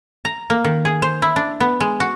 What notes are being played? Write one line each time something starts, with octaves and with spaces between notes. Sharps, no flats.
A#5
A#3
D#3
G#4
C5
E4
D4
B3
G#3
F#4